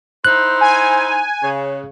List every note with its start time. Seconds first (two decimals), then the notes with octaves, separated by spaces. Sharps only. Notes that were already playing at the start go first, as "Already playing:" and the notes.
0.25 D#4 E4 C5 F#6
0.61 G#5
1.43 C#3